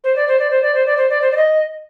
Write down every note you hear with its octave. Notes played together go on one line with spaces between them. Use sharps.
C5
D5
C5
D5
C5
D5
C5
D5
C5
D5
C5
D5
D#5